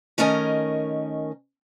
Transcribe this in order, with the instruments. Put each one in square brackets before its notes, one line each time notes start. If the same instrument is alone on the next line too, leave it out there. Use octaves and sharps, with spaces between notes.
[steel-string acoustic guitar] D#3 A3 C#4 A#4 D#5 G#5